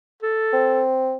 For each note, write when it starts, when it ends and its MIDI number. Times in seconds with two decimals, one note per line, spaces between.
0.23 0.83 69
0.53 1.16 60